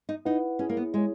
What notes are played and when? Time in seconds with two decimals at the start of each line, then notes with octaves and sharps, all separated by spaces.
0.09 D#4
0.25 D#4 E4 B4 F#5
0.59 C#4 E4 G#4 C#5
0.69 A#3
0.77 B3
0.93 G#3 E4 G#4 C#5